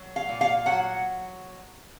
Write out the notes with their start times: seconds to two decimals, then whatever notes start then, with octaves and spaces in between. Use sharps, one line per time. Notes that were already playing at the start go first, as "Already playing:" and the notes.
Already playing: F#3
0.16 F5
0.29 A#2
0.41 F5
0.66 F#3 F#5